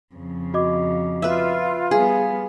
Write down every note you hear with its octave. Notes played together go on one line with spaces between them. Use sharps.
F2 C#3
F#4 D#5 D6
F4 B4 E5
G3 B3 G#4 F5